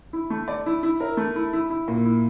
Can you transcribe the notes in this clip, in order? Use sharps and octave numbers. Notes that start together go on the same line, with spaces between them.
E4
A3
D5
E4
E4
A#4
A3
E4
E4
E4
A#2
E4